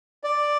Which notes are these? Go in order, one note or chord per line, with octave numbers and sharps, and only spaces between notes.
D5